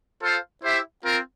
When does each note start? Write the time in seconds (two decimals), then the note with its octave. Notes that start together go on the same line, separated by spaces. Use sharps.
0.22 F4 A4 C5 F5
0.64 E4 G4 C5 E5
1.05 C4 F4 A#4